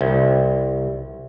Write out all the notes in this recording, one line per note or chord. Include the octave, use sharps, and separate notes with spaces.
C2